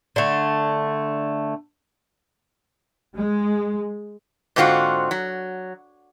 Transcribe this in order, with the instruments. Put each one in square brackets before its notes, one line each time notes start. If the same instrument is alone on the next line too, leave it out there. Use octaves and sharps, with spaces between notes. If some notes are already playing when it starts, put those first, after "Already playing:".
[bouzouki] D3 A3
[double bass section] G#3
[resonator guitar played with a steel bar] G#2 D3 C4 F4 F#4
F#3